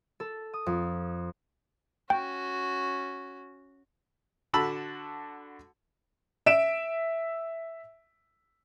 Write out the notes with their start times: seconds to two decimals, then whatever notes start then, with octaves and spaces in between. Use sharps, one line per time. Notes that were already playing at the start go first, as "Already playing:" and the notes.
0.20 A4
0.53 D#6
0.66 F2
2.10 C#4 F#4 G5
4.54 D3 F#4 A5 B5 E6
6.46 E5 D7 E7